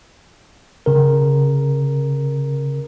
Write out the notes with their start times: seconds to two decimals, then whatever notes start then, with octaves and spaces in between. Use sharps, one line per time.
0.86 C#3 A#4